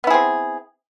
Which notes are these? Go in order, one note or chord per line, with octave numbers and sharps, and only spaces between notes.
B3 C4 E4 G#4